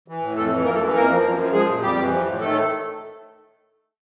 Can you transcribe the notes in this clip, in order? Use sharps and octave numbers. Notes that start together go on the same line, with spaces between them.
E3
A2
F2 A3 A4
E3
F#2 A#3 A#4
A3 A4
E3
F2 A#3 A#4
F3
F#2
F3
F3 G#3 G#4
A#2
F2 G3 G4
E3
F3
A2
D#3 A3 A4